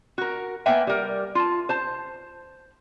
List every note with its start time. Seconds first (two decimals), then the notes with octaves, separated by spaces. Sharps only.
0.18 F#4 A#4
0.66 A#3 B3 E5 G5 G#5
0.87 G3 A#4
1.35 F4 A5
1.69 C5 A5